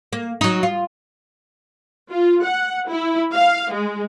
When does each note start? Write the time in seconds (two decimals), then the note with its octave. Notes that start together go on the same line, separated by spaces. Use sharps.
0.13 A#3
0.41 F#3 D#4
0.63 F4
2.11 F4
2.43 F#5
2.89 E4
3.35 F5
3.71 G#3